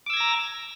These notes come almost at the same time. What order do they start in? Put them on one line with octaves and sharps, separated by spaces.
D6 E6 G#6 A#6 A#5